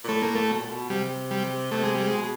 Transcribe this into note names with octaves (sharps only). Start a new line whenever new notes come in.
A#2
A2 A3
A#3
A3
B2
A#2
B2
C3 G3
G3
C3 A3
G#3
G3
G#3
B2